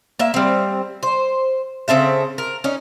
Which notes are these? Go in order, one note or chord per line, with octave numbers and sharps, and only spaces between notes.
A#3 E5
G3 C4
C5
C#3 C4 A4 E5
A#4
C#4 D#4